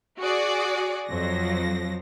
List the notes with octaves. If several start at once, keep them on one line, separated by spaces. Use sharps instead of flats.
F#4 G#4 D5
F2 F3 F#3 A#6